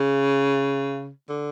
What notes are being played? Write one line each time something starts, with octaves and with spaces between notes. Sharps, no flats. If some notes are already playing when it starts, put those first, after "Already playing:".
Already playing: C#3
D3